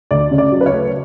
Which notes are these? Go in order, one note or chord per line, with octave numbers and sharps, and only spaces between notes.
D2 D5
C#3
D5
F#3
B4
C#5
A3